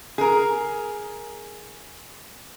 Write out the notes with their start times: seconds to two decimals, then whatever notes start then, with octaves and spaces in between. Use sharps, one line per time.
0.18 G#4 A#4